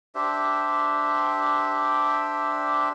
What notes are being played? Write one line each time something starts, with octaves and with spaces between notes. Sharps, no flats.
D4 G4 C5 E5